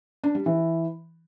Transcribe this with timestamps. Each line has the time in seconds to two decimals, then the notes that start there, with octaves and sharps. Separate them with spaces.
0.24 D4
0.35 G3
0.46 E3